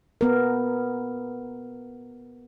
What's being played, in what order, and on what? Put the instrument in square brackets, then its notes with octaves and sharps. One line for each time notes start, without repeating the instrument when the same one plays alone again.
[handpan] B3 A#4